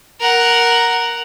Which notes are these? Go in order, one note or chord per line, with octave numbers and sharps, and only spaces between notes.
A#4 F#5